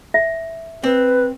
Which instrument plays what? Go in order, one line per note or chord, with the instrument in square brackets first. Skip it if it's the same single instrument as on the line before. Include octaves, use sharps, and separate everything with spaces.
[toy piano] E5
[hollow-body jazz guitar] C4 [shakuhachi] B4